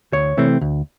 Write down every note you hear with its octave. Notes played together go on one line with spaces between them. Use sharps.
D2 C#5
C3 E3 A3 C4
D2